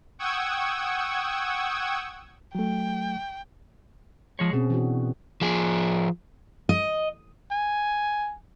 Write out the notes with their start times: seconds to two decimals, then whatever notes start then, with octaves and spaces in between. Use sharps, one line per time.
0.19 F#5 G5 C#6 D#6 E6 G#6
2.55 F#3 A3 G5
4.39 F3 G#3 C#5
4.53 B2 C4 C#4 G#4
4.70 E3 D4 F#4
5.41 F3 G#4
6.69 D#5
7.51 G#5